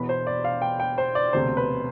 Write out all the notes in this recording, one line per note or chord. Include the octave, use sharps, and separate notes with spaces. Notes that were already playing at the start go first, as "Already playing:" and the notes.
Already playing: E1 E2 B2 B3 B5
C5
D5
F5
G5
G5
C5
D5
E1 D2 C3 C5
B4